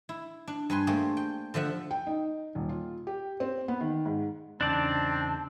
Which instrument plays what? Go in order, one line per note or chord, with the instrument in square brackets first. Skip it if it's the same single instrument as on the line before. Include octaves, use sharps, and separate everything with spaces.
[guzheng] E4
D4
G2 B4 G#5 C6
A3 A#3 G4 G#4 C5
G5
D3 F3 E5 F#5
[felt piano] G5
D#4
D#1
F4
G4
C4
B3
D#3
G#2
[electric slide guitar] E2 C#3 D#4 [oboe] C4 [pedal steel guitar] D4 D5 [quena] A5